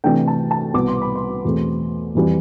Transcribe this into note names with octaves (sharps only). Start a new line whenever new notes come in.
C3 E3 A3 D4 G5
A5
A5
C2 B2 B3 D6
C6
B5
C6
E2 B2 A3 C4
F2 E3 G3